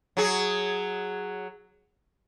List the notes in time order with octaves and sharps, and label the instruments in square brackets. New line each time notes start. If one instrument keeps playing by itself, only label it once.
[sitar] F#3 G#4